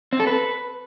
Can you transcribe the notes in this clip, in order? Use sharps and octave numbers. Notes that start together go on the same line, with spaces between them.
C4
A4
B4